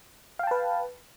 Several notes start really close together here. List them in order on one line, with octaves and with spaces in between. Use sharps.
F5 G5 A5 B4